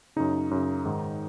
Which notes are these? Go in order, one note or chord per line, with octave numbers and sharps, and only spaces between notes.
F#2 C#3 D#4
F#2 C#3
G#2 D#3